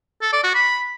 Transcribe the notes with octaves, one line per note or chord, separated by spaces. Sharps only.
A4
D5
F#4
B5